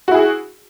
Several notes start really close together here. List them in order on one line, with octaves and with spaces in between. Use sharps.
F#4 E4 G#4